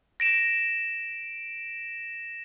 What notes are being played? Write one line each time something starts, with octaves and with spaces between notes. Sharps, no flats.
A#6 D7 E7